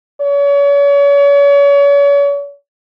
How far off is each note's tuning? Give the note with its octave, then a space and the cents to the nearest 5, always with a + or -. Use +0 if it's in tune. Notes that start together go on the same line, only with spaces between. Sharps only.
C#5 +40